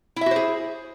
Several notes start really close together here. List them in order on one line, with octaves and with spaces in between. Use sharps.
E4 E5 F#4 C5 G#4